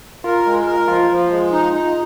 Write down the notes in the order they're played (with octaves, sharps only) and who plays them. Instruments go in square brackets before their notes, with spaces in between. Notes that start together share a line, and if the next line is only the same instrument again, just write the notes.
[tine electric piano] F4 [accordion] A#4
[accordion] G#3
A#4
[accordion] F3 [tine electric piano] F4
[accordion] F3
G#3
D#4
D#4